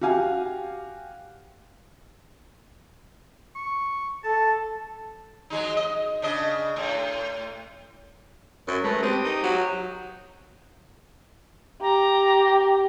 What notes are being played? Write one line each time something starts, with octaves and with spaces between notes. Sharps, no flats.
F#4 G4 F5 G#5
C#6
A4 A5
F#3 G#3 D#4
D#5
C#3 D4 D#5
A2
F#2
G#3 A3 A#4 B4
C4 G4 D#6
D#4
F#3
G4 A#5